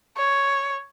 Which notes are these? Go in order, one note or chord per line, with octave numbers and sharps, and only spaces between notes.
C#5